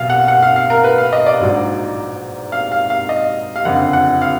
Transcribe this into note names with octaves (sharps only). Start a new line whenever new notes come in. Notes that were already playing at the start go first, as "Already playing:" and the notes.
Already playing: B1 B2 F5
F#5
F#5
F5
F5
A#4
B4
F5
D#5
D5
A#1 G#2 F#3
F5
F5
F5
D#5
F5
F#1 F2 D3 F#5
F#5
F5